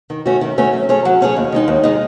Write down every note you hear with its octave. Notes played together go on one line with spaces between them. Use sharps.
D#3
A3 C#4 F#4
D#3
A3 C#4 F#4
F#3
A3 C#4 G#4 C#5
F#3
A3 C#4 G#4 C#5
D#2
D#3 G#3 D#4
D#2
D#3 G#3 D#4